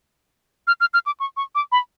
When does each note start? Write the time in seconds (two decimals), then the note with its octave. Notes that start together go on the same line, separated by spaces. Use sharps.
0.67 F6
0.80 F6
0.94 F6
1.06 D6
1.20 C#6
1.37 C#6
1.55 D6
1.72 B5